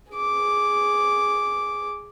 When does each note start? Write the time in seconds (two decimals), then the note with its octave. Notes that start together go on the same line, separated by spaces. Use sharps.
0.12 G#4 D6